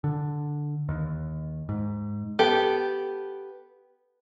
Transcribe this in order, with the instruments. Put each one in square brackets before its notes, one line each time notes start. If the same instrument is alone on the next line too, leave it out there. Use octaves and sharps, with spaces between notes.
[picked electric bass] D3
D#2
G#2
[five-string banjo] B3 G4 A4